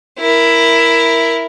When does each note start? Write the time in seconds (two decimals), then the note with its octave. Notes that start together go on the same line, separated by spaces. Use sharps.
0.19 E4 A#4